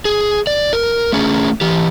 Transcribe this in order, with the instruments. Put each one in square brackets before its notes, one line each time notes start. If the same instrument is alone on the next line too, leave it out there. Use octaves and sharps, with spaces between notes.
[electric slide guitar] G#4
D5
A#4
A3 C#4 G#4
E3 G4